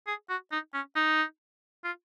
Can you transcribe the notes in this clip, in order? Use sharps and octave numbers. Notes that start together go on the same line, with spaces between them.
G#4
F#4
D#4
C#4
D#4
F4